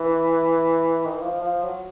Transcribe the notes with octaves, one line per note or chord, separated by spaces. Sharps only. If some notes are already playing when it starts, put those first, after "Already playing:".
Already playing: E3
D#3
E3
F3
F3
F#3